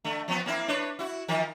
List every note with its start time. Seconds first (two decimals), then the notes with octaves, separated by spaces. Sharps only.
0.04 D3 A3
0.28 F3 B3 C4
0.46 A#3 C4 E4
0.68 D4 B4 C#5
0.99 E4 F#4
1.28 D#3 F3 A#4